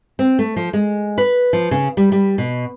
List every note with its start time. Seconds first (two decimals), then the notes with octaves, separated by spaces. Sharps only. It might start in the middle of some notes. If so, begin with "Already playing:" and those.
0.19 C4
0.39 A3
0.56 F3
0.73 G#3
1.18 B4
1.53 F3
1.71 C#3
1.97 G3
2.12 G3
2.38 B2